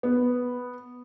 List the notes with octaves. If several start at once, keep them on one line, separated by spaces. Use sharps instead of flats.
B3